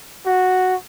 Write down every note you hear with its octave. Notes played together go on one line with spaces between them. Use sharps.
F#4